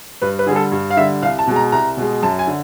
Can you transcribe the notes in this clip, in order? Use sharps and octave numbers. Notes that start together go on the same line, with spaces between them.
G2 B4
B4
D3 G3 G#4 A4
G2
F5
D3 G3 E5
C2 F5
A5
B2 G#3
A#5
C2 A#5
B2 G#3
F#2 A5
G#5
D3